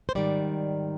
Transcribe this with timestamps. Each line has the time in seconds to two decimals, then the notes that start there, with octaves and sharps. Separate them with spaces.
0.09 C5
0.15 G#2 D#3 G3 D5